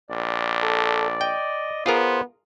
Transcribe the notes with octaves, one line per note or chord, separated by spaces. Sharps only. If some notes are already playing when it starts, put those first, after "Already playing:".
A#1 D5
A4
D#5 G5
B3 F4 G#4 A#4 C5